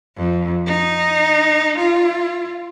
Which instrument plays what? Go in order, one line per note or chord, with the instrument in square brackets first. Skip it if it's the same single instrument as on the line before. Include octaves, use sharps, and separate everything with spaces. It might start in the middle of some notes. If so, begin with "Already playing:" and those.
[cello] F2
D#4
F4